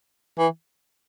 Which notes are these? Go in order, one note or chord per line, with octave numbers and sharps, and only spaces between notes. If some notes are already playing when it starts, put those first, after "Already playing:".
E3